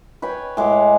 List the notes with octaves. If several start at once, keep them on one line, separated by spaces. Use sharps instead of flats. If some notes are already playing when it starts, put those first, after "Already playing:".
B4 C#5 G5 G#5
A2 G#3 C#5 D6